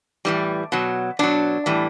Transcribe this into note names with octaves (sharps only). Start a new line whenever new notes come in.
A2 E3 G3
B2 F#3
B2 F#3 D4
A2 E3 G3